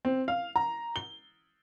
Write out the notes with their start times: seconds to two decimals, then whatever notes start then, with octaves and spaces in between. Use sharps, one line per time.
0.05 C4
0.28 F5
0.56 A#5
0.96 G7